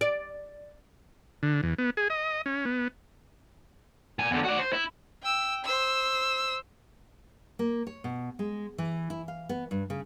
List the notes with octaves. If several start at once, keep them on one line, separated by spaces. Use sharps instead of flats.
D5
D3
E2
B3
G#4
D#5
C#4
B3
A#2 G#5
E2 D3
F#4 D5
C5
E4
G5 E6
C5 E6
A#3
C#5
B2
G#3
E3
E4
F5
B3
G2
C#3